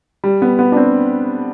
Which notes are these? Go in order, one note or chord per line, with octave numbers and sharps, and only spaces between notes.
G3
B3
B3
D4
C4